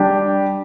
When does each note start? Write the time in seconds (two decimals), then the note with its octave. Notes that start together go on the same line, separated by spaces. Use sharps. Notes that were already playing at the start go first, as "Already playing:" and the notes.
Already playing: G3 D4 G4